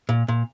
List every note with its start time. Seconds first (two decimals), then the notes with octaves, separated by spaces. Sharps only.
0.09 A#2
0.28 A#2